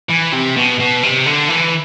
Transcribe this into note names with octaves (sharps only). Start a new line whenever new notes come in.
E3
C3
B2
B2
C3
D3
E3